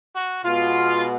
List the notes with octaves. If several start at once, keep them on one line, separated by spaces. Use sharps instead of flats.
F#4
B2 G#3 B3 F4